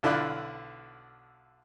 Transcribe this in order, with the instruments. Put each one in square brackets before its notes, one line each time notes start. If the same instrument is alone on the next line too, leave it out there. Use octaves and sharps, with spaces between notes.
[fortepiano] B1 D3 E4 F4 D5 F#6